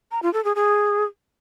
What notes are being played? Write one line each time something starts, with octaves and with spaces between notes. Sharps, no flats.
A#5
F4
A4
G#4
G#4